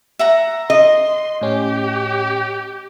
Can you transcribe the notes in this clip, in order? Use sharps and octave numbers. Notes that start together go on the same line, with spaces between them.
E5 F#5 A#5
D#5 C6
A2 C#4 G4